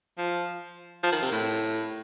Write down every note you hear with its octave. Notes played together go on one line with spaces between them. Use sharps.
F3
F3
D#3
C3
A2